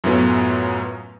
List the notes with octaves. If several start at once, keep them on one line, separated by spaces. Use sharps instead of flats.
F#2 A2 F#3 B3 C#4 F4